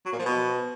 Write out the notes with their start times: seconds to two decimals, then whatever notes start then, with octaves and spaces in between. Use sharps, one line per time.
0.05 F#3
0.12 A#2
0.19 F3
0.26 B2